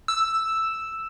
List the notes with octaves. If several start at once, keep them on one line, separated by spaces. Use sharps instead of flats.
E6